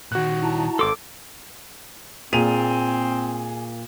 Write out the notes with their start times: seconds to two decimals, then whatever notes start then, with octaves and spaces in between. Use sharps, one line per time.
0.12 A#2 D#3 F#4 F#6
0.43 E4 A5 A#5
0.79 G#1 A4 C6 D6
2.33 A#2 C4 G#4 D#7 F7